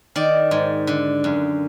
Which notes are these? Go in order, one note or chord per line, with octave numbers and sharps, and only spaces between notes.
D#3 D5
G#2
D3
F#2